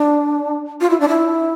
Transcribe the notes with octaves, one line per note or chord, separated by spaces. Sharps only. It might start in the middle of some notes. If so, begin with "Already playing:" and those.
Already playing: D4
F4
E4
D4
E4